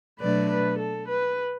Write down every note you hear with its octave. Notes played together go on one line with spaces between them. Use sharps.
B2 F#3 A3 D4 B4 D5
B4
A4
B4